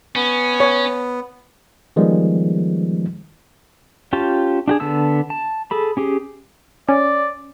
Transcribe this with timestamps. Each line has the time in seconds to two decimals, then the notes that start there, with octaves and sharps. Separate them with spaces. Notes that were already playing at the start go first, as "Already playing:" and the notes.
0.16 B3 C#4
0.60 C#5
1.96 D#3 F3 G3 G#3 B3
4.13 C#4 F4 G4 A5
4.68 D4 F#4 G#4
4.80 D3 B3 A5 E6
5.30 A5
5.71 G#4 A4 B5
5.97 C#4 G4 G#4
6.89 C#4 D5